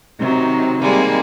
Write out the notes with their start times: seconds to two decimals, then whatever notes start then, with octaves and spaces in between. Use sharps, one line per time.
0.18 C3 D#3 F#3 D#4
0.80 C3 D#3 G3 G#3 A#3